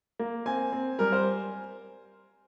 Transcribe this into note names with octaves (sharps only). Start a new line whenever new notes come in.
A#3
C4 G#5
C4
G3 A#4
C5